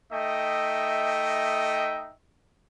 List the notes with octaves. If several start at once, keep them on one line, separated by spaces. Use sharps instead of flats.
A3 D#4 D#5 E5 G5